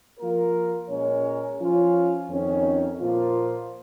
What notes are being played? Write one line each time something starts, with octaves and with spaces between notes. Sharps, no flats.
F3 A#3 F4 A#4
A#2 G#3 C#4 A#4 C#5
F3 C#4 F4
F2 D#3 C#4
A#2 F3 A#3 F4